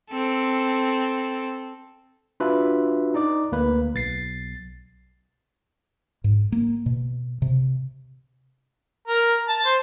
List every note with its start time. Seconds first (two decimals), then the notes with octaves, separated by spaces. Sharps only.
0.11 C4 A4
2.40 D4 F4 F#4 B4 E5
3.14 D#4 D5 D6
3.52 D2 A#3 B4
3.94 B1 A6 C7
6.24 G#2
6.52 A#3
6.86 B2
7.42 C3
9.08 A#4
9.48 A5
9.66 C5